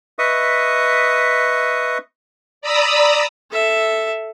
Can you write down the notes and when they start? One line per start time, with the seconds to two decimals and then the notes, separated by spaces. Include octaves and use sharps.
0.19 B4 D#5 E5 C#6 D#6
2.61 D5 A#5 B5 D#6 E6
3.51 A4 E5